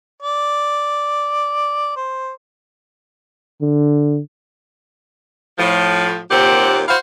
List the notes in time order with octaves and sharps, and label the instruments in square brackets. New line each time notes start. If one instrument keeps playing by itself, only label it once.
[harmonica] D5
C5
[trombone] D3
[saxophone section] A2 F3
D#2 A#2 C4 G4 F#5
E4 F#4 C5 F5